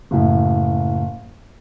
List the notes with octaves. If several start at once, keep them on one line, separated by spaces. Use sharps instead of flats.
F#1 A2